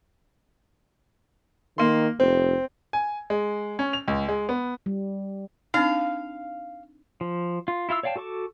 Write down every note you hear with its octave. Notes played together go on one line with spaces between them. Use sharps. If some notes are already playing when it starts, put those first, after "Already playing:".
D#3 A#3 C6
F1 C4
G#5
G#3
C#4
F7
C#2
G#3
B3
G3
C4 D4 D#4 F5
F3
F4
E4 F4 F5 E6
C#5 D5 F5 G5 A5
F#4 A4 A5 C#6 D6